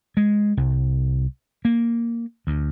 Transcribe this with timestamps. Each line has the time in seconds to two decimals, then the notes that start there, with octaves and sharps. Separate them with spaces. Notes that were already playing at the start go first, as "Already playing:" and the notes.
0.17 G#3
0.57 C2
1.65 A#3
2.47 D2